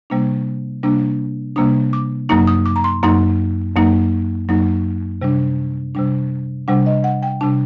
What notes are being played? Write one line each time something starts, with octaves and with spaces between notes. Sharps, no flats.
C3 G3 A#3 D4
C3 G3 A#3 D4
C3 G3 A#3 D4 D#6
D6
F#2 F#3 A#3 D#4 D#6
D#6
D6
A#5
C6
F#2 F#3 A#3 D#4 C6
F#2 F#3 A#3 D#4
F#2 F#3 A#3 D#4
C3 G3 D4
C3 G3 D4
C3 G3 D4 F#5
D#5
F#5
G5
C3 G3 D4 A5